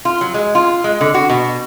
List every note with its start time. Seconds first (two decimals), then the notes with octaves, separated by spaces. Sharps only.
0.05 F4
0.21 F#3
0.34 G#3
0.55 F4
0.84 G#3
1.01 D3
1.14 F#4
1.30 B2